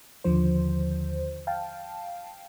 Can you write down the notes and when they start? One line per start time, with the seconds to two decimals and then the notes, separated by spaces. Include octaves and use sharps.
0.24 D#2 D3 F3 C5
1.47 F5 G5 A5